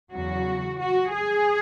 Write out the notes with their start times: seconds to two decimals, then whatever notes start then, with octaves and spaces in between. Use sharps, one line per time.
0.13 E2 C#3 F#3 F#4
0.80 F#4
1.14 G#4